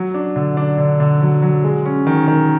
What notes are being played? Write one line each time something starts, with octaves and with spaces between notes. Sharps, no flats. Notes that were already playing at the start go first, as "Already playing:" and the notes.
Already playing: F#3
D4
D3
D4
D3
D3
F#3
F#3
G#3
C#4
D#3
D#3